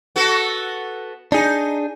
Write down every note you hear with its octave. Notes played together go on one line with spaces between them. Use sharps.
B3 F#4 A4
D4 D#4 G#4